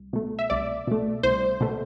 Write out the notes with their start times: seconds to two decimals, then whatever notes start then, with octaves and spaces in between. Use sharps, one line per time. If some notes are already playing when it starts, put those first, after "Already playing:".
Already playing: C2
0.13 B2 A3
0.39 E5
0.50 C2 D5
0.87 B2 A3
1.23 C2 C5
1.61 B2 A3